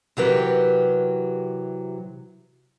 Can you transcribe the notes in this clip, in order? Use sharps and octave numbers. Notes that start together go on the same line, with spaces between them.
C3 E3 F#3 G4 A#4 B4